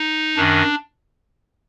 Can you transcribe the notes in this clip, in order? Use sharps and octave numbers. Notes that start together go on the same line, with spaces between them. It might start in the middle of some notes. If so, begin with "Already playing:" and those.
Already playing: D#4
F#2 D#3 D4